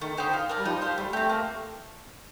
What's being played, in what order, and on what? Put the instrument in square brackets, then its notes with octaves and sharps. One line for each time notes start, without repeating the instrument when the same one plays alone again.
[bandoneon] D#3 [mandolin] A3
[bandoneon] D3 [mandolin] D#4 G4 C5
[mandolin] F4
A#4 D5 A5
[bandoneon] G3
[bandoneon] F3 [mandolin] D#4
[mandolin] G4 C5 F5
[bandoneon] G3 [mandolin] A3
[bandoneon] A3 [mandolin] C4 G4
[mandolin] A#3